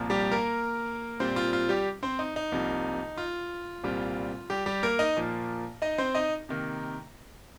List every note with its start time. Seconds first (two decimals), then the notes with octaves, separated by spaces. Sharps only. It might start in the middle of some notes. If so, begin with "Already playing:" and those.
Already playing: C2 A#2 F3 A#3
0.10 G3 G4
0.31 A#3 A#4
1.20 A#2 G3 C4 C5
1.36 F4
1.53 F4
1.69 G3 G4
2.03 C4 C5
2.19 D#4
2.36 D#4
2.52 C2 C3 F3 A#3
3.18 F4
3.84 C2 A#2 G3 C4 F4
4.50 G3 G4
4.66 G3 G4
4.83 A#3 A#4
4.99 D#4 D#5
5.17 A#2 F3 A#3
5.82 D#4 D#5
5.98 C4 C5
6.15 D#4 D#5
6.49 C3 D#3 A#3